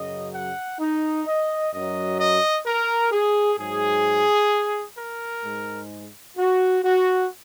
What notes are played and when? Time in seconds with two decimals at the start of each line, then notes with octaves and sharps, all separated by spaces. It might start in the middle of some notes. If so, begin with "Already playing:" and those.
Already playing: F#2 C#3 F#3 D#5
0.34 F#5
0.79 D#4
1.26 D#5
1.72 F#2 F#3 D#5
2.18 D#5
2.66 A#4
3.11 G#4
3.59 G#2 F#3 G#4
4.97 A#4
5.43 G#2 G#3
6.37 F#4
6.84 F#4